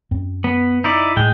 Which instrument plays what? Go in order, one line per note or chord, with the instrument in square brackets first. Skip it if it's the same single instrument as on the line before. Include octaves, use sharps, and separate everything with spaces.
[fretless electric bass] F#2 C4
[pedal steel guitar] B3
D#4 E4 D5
[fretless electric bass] A2 [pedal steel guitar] G#3 G5